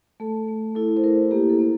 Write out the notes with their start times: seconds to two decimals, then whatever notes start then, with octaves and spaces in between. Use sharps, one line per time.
0.20 A3 A4
0.48 A3
0.75 E4 A4
0.97 C5
1.04 E4 A#4
1.31 A#3 G4
1.50 A4
1.59 A#3